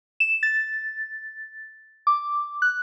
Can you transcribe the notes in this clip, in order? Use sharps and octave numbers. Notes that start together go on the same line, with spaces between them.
E7
A6
D6
F#6